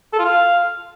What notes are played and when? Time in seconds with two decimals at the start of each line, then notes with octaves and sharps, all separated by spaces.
0.13 A4
0.19 F4
0.25 F5